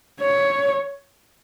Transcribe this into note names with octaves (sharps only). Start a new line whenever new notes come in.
C#5